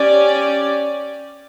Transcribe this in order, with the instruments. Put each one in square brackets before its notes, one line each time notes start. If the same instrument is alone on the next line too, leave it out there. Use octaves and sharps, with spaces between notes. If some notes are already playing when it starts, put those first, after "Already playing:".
Already playing: [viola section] C#4 G4 D5